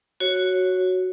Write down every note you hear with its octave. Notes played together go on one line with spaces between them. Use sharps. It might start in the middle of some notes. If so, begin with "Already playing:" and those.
F#4 C#5